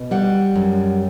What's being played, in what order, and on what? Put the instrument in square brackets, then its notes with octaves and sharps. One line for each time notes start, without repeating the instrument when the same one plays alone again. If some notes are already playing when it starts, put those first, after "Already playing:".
Already playing: [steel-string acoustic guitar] B2
G3 F#5
F#2